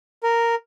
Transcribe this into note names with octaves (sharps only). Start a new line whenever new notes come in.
A#4